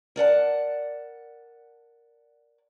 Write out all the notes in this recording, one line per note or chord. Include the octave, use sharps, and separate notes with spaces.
A#4 D5 F#5 A5